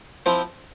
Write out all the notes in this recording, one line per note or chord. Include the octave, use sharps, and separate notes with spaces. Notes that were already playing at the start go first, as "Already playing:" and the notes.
F3 C4 E4